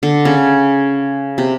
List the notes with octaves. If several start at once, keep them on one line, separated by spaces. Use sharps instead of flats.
D3
C#3
C3